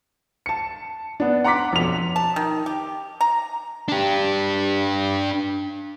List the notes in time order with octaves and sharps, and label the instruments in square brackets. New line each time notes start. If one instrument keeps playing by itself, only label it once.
[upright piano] A5 C#7
B3 D4
F#5 A#5 C6 D6 B6
B1 F2 F7
[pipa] A5
D#3
G4
A#5
[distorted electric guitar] D4 G4